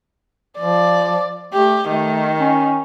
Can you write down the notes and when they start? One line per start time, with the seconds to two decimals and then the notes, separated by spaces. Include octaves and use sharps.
0.59 F3 D5
1.53 A3 G4
1.88 D#3 A3
2.40 C#4